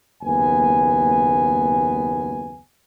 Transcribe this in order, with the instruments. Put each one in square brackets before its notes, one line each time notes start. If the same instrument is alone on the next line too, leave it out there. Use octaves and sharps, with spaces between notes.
[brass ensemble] F#1 D#2 B3 G#5